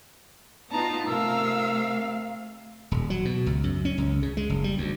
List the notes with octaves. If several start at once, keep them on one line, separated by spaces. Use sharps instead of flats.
B3 D#4 F4 A5 A#5
C3 A3 A#4 F5 E6
D#1
F#3
B2
C#2
F#2
C#4
C#2
C#3
G#3
F#1
G3
D2